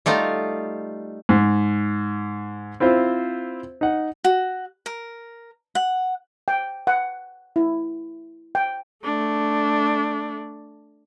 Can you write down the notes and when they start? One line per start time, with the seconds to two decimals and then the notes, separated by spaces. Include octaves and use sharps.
0.06 G3 A3 D#4 F4
1.29 G#2
2.80 C4 E4 F4 C5
3.81 D#4 F#5
4.24 F#4
4.86 A#4
5.75 F#5
6.48 G5
6.87 F#5
7.56 E4
8.55 G5
9.04 A3 D4